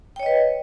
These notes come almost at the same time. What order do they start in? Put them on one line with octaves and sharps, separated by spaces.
G5 C#5 D#5 B4